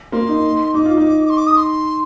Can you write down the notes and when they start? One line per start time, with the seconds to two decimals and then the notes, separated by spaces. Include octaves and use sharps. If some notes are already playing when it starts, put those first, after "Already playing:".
0.12 A#3 C6
0.28 D#4
0.74 D#4 D6
0.86 F4
0.97 D#4
1.30 C6
1.37 D6
1.47 D#6
1.57 C6